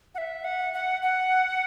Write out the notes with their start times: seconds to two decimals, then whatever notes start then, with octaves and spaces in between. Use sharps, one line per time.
0.15 F#5
0.18 E5
0.44 F#5
0.73 F#5
1.02 F#5